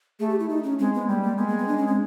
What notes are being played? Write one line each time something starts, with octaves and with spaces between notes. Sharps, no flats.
A3 G#4
G4
E4
D#4
C#4
G#3 C4
B3
G3 A#3
A#3
G#3 B3
A#3
B3
D4
C#4
C4